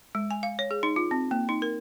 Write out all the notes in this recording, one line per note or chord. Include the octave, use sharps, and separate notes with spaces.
G#3
G#5
F5
C#5
G#4
D#4
F4
C4
A#3
D#4
A#4